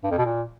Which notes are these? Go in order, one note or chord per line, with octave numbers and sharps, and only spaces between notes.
G2
F2
B2
A#2